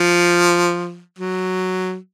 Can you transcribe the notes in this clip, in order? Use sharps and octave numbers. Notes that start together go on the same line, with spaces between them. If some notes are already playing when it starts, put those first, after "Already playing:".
Already playing: F3
F#3